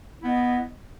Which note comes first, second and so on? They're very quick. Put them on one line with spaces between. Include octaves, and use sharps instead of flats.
E4 B3 D#5